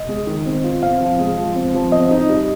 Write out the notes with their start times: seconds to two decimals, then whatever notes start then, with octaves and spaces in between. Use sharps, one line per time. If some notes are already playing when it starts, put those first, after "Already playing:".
Already playing: D#5
0.09 G#3
0.27 D#3
0.45 C4
0.64 F4
0.83 C4 F5
1.01 F3
1.19 G#3
1.37 F3
1.55 C4
1.74 F3
1.92 C4 D#5
2.11 D#4
2.29 G3